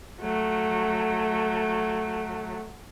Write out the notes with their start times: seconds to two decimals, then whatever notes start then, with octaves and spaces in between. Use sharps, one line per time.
0.21 F#3 A3